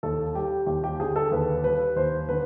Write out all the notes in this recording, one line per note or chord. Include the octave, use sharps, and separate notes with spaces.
D#2 A4
G3 G4
D#2 G4
G4
D3 G#4
A4
D#2 B4
G3 B4
D#2 C5
D3 B4